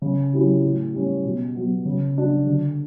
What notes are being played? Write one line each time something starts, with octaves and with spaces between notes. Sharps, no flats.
C#3
F#3 C#4 E4 G4
A2
G3 C#4
B2
F#3 B3
C#3
G3 D4 F#4
D3